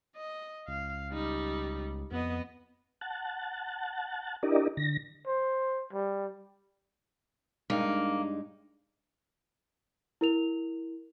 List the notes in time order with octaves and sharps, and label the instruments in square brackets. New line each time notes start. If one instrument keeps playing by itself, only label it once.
[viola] D#5
[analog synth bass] C#2 [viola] F5
[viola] G3 D#4
[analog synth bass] F2 [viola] B3 D#5
[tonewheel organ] F#5 A5
D4 E4 G4 A#4 D5 D#5
D3 A#6
[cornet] C5
G3
[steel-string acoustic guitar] G2 G#3 D#4 [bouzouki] A#3
[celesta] E4 A#4 F7